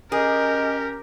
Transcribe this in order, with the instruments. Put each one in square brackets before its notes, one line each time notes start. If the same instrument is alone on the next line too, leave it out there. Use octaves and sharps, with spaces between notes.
[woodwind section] C#4 G4 [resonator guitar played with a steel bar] G#4 [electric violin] A#4 [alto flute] D#5